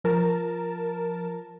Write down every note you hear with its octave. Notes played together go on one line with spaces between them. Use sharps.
F3 A#4 A5